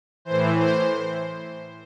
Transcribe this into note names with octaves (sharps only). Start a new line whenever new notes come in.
A2 E3 C5
C5